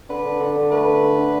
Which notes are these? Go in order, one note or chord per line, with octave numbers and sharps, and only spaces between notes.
D3 B4
D3
D3
D3
A3 B4
D3
D3
D3